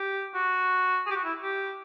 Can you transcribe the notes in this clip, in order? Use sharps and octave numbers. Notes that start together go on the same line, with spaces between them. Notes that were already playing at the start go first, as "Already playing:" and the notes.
Already playing: G4
F#4
G#4
G4
F#4
E4
G4